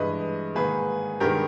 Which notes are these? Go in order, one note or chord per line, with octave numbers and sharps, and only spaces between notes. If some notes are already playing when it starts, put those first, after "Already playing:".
Already playing: G2 E3 G#3 B4 D#5
G#2 D#3 A#3 G#4 B4
G2 D#3 G#3 B3 G4 A#4